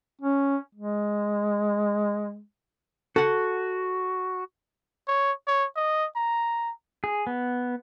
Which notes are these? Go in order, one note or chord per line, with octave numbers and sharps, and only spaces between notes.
C#4
G#3
F#4 A4 F#5
C#5
C#5
D#5
A#5
G#4
B3